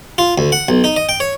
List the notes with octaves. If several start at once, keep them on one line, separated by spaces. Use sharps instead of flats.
F4
D2
F#5
B1
D#4
D#5
G5
C#5